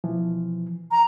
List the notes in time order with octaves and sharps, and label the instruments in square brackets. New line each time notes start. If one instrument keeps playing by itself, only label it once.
[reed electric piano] B2 E3 F3
[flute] A#5